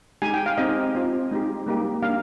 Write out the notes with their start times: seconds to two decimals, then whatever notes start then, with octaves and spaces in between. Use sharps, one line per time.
0.22 G#3 D#4 G4 G#5
0.34 G5
0.46 F5
0.58 C4 D#4 G4 D#5
0.95 C4 F4
1.31 G#3 D#4 G4
1.66 G3 A#3 D#4 G4
2.03 A#3 D4 G4 F5